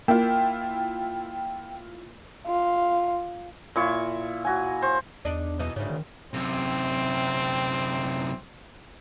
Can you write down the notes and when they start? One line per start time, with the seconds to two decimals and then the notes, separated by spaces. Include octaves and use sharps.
0.08 A#3 E4 F4 G5
2.47 F4
3.76 A#2 E4 C#6
4.45 F#4 G#5
4.82 C5 C#6
5.25 E2 D4 D#4
5.59 B2 E3 D#4
5.76 D2 G#2 C#3
5.90 D#3
6.34 F#2 C3 C4